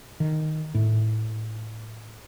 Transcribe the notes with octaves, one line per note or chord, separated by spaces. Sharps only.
D#3
A2